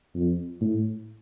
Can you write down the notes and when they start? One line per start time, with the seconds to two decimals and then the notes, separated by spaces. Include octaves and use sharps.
0.15 F2
0.61 A2